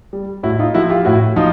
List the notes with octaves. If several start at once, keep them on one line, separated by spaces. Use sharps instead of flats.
G3
A2 E4 F#4
D#4 F4
F3 E4 F#4
F4 G4
A2 E4 F#4
F3 D#4 F4